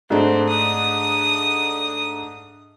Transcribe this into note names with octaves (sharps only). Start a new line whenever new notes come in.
G#2 A3 C4 D4
D#6